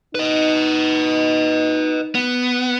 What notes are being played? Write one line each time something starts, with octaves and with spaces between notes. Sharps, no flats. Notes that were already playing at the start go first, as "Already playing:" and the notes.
D#4 B4 D#5
B3